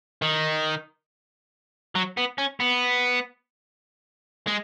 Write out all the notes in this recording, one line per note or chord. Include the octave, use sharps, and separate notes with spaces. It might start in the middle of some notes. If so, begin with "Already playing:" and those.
D#3
F#3
B3
C#4
B3
G#3